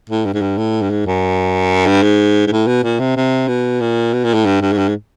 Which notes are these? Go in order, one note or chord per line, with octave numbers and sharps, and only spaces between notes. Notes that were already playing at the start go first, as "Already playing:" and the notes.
A2
G2
G#2
G2
A2
G2
G#2
F#2
G2
G#2
G#2
A2
B2
A#2
C3
C3
B2
A#2
B2
A#2
A2
G2
G2
G#2
G2
G#2